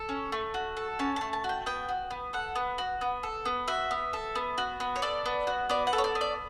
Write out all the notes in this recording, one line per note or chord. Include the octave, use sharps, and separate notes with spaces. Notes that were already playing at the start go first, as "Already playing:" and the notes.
Already playing: A4
C#4
A3
F#4
A4
C#4 A5
A3 A5
A5
F#4
G5
B3 G5
F#4
B3
A4 F#5
B3
F#4
B3
A4
B3
F#4 E5
B3
A4
B3
F#4
B3
C#5
A4 D5
B3
F#4
B3 D5
F#5
A4
C#5
D5
B3
D5